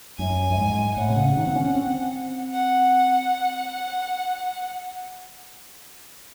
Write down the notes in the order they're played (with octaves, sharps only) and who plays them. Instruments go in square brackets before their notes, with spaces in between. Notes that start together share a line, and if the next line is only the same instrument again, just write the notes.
[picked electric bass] F#2 [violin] G#5
[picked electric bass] F#2
G#2
[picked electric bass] A2 [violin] F#5
[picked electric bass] C3
C#3
D#3
C4
C#4
C4
[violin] F#5